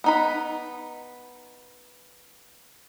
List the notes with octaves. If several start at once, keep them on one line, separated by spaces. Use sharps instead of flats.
B3 D#4 B5